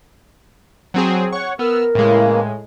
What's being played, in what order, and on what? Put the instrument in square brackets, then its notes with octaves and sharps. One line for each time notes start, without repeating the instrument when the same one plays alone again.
[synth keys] F#3 C4 G#4
[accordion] C#5 F#5 [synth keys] C#6
[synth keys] B3 [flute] A#4 [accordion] E6 F6
[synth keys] A2 G#3 [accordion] C#3 E3 A#3